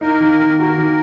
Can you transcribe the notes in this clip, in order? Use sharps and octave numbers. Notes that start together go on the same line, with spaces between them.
A#3 D#4 A#4
D#3
D#3
A#3 F#4 A#4
D#3